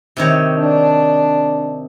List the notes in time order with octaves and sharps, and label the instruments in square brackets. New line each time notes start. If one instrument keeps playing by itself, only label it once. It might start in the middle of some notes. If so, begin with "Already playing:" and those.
[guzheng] C3 D#3 C#5
[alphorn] D4